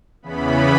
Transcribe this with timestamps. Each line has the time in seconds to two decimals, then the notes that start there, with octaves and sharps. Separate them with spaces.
0.22 E2 C#3 E3 B3 B5